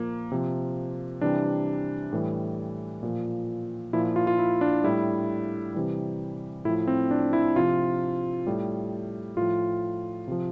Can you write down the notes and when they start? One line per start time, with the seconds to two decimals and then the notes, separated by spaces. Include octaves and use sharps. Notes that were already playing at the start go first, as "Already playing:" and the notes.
Already playing: A#2 F3 A#3
0.32 C3 F3
1.21 C3 E3 G3 D4
2.12 A2 E3 G3
3.03 A#2 F3
3.93 A#2 F3 E4
4.16 F4
4.27 F4
4.39 E4
4.61 D4
4.84 A2 G3 E4
5.74 C3 E3 G3
6.65 A2 E4
6.69 F3
6.87 C4
7.11 D4
7.33 E4
7.56 C3 F3 F4
8.47 A2 G3
9.37 A2 F3 F4
10.28 C3 F3